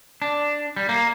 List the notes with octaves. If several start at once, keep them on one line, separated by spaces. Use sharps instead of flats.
D4
G3
A#3